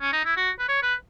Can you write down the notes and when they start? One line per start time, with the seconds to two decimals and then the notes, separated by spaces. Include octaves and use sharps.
0.01 C#4
0.13 D#4
0.25 E4
0.36 F#4
0.59 B4
0.68 C#5
0.82 B4